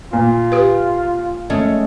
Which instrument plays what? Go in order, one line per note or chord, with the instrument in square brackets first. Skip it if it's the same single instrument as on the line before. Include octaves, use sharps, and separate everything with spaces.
[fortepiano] A#2 [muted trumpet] F4
[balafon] G4 B4
[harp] G#3 A3 C#4